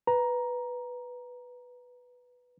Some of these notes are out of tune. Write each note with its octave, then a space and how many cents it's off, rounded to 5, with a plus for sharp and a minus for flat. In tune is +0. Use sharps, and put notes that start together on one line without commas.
B4 +0 A#5 +10